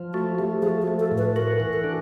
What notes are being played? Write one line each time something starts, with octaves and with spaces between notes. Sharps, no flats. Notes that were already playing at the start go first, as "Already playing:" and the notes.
Already playing: F3
A3 F#4
A3 G4
F3 G#4
F#4
A3
A4
A2
B4
F#4 A#4
A#4
E3
A4
D4